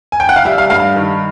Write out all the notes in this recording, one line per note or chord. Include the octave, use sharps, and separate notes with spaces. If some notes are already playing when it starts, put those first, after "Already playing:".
G#5
G5
F#5
F5
G3 E5
F5
G2 F5
D#3